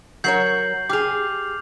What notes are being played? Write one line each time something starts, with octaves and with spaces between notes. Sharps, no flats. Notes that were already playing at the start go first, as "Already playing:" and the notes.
F#3 A#4 C#5 G6 C7 F#7
G4 G#4 D6 F6 F7